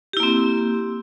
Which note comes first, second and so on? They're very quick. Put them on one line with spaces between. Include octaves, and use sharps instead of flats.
G4 E4 A#3 C4